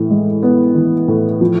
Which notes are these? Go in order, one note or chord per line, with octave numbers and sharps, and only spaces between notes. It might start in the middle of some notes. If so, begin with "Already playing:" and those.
Already playing: A2 E3
G#3
B3
E3
A2
F3